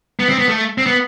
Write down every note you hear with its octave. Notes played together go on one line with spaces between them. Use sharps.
B3
C4
B3
A3
C4
B3